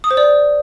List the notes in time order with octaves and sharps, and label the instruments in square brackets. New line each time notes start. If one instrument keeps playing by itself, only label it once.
[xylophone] D#6
C5
D5